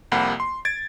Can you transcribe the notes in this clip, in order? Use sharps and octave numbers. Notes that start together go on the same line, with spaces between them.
C2 F2 C3 A#3 F#5 B5
C6
G#6 A6 D7